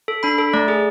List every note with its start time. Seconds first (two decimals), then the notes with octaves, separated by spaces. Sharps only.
0.08 A4
0.23 D4 B5
0.38 A4
0.53 A3 D5
0.68 G#4